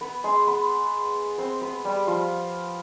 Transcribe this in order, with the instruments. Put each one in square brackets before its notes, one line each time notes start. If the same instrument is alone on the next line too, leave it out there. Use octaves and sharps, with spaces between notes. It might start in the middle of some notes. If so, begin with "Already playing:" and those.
[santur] B3 B4
G#3 G#4
B3 B4
C4 C5
B3 B4
G3 G4
F3 F4